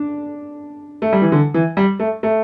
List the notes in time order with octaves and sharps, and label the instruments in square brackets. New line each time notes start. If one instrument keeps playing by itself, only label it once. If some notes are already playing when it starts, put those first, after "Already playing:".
Already playing: [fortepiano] D4
[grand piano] A3
G3
E3
D3
E3
G3
A3
A3